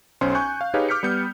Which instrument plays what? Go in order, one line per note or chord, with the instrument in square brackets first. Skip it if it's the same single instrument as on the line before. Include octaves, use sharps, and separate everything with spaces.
[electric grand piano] B1 C#4 C5 C6
G#5 C#6 F#6 G6
F5
D#4 G4 G#4 B4 C#5 F5
D6 F6 G6 B6 C#7
G3 B3 G6 C#7